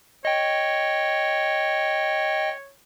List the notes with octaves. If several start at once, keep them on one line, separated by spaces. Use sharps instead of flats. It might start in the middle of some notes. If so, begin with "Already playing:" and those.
C#5 D#5 G5